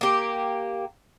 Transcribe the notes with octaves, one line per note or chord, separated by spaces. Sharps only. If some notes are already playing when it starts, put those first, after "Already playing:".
A#3 G4